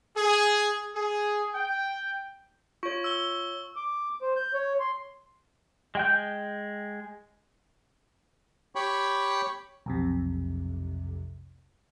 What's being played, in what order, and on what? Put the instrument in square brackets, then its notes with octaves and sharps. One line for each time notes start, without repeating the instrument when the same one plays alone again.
[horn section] G#4
G#4
G5
[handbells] F4 C#5 [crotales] C#6
[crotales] E6 G7
[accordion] D6
C5
G6
C#5
C6
[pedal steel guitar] G#3 G5 G6
[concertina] G4 C#5 G5 B5 C#6
[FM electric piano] B1 F2 C3